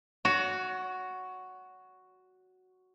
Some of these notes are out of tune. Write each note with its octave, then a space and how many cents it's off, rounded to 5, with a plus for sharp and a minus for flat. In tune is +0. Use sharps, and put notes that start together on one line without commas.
F#4 +0 C#5 +35